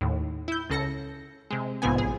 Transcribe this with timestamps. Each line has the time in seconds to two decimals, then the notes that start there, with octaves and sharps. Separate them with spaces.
0.01 D#2 A2
0.48 E4 G6
0.70 C#2 C#3 A4 A#6 C#7
1.51 C3 G#3
1.82 B1 G#2 C3 F3 B3 G#5
1.98 A1 G#4